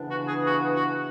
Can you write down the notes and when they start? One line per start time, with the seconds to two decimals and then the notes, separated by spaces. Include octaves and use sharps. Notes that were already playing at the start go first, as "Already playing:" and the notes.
Already playing: C#3 E3 B3 D4
0.10 F#4
0.28 G#4
0.47 F#4
0.75 F#4